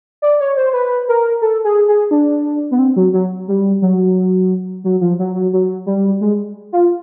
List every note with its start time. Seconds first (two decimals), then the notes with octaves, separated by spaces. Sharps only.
0.22 D5
0.40 C#5
0.57 C5
0.73 B4
1.08 A#4
1.42 A4
1.65 G#4
1.88 G#4
2.11 D4
2.71 B3
2.79 C4
2.96 F#3
3.13 F#3
3.48 G3
3.82 F#3
4.84 F#3
5.01 F3
5.19 F#3
5.35 F#3
5.53 F#3
5.86 G3
6.21 G#3
6.72 F4